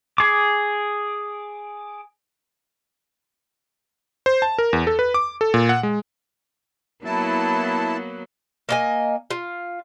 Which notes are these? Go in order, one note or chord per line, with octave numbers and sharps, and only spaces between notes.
G#4 D6
C5
A5
A#4
E2
A4
B4
D6
A4
A#2
F#5
G#3
F#3 A#3 B3 E4 A5
A#3 D#5 G#5
F4